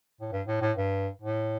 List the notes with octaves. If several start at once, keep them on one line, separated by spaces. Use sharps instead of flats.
A2
G2
A2
A2
G2
A2